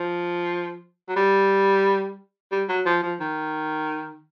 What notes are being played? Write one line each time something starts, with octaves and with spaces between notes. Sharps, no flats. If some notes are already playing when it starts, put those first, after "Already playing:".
Already playing: F3
F#3
G3
G3
F#3
F3
F3
D#3